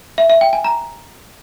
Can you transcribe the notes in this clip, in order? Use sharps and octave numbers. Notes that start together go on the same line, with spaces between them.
E5
E5
G5
G#5
A#5